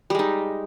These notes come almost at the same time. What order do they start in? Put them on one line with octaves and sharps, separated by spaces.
G3 G#3 D#4